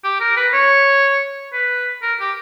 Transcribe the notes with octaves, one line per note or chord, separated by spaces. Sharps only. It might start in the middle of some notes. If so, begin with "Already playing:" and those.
G4
A#4
B4
C#5
B4
A#4
G4